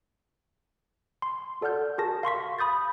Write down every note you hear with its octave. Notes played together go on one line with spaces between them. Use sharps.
C6
F#4 A4 D5 F#5 F6 G6
F#4 G#4 A#4 A5 A#6
F5 C6 C#6 B6
B5 D#6 G6 A6